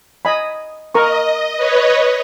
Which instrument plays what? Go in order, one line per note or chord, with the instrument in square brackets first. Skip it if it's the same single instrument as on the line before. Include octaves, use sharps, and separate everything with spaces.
[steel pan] D#5 G#5 B5
[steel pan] A#4 A#5 C#6 [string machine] D#5
[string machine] B4 C#5 D#5